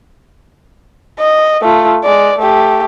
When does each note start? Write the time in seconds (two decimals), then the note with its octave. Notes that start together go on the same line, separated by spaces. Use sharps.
1.19 D#5
1.62 A3 F4
2.04 G#3 D5
2.39 A3 G4